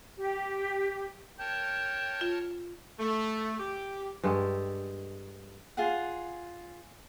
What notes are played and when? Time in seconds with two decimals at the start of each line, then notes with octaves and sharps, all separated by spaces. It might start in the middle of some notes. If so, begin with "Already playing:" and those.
0.20 G4
1.39 A#4 C#5 G5 A5
2.21 F4
2.99 A3
3.59 G4
4.23 G2 G#3 G4 A4
5.77 F4 G#4 F#5